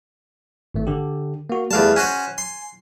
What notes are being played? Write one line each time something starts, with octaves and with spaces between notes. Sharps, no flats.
G#1 A3
D3 G4
A#3 F#4
E2 G3 A3 F5 A5
C#4 F#4 C5 G#5
C6